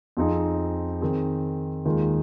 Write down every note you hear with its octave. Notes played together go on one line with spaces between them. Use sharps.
F2 F3 C4 D#4 G#4
D#3 C4 G#4
D#2 D#3 G#3 F4 G#4